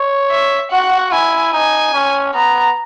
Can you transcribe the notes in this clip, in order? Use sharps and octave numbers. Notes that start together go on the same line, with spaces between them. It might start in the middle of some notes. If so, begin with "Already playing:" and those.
Already playing: C#5
E5
F#4 F#5
E4 G#5
D#4 G#5
C#4
B3 A#5